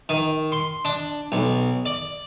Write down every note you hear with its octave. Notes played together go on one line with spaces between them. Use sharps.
D#3
C6
D4
B1
D5